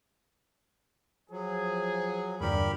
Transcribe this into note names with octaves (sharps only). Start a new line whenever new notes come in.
F3 F#3 G#4
E2 G2 A#2 D3 G4 A#4 B5